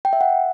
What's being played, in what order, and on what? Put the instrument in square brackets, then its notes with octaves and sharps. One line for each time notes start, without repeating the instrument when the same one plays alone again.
[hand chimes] G5
E5
F#5